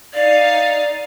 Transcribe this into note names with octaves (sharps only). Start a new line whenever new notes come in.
D#4 D5 F5